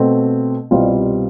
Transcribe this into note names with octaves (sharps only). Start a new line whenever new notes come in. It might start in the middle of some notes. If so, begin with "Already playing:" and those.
Already playing: B2 A3 C4
C2 B2 G3 C4 F4